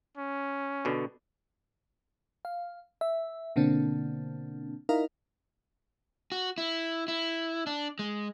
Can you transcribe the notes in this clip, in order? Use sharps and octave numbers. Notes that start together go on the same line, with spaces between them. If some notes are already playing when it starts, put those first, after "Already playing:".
C#4
B2 D3
F5
E5
B2 D3 A#3 C4 D4
D#4 E4 A#4 D#5 F5
F#4
E4
E4
D4
G#3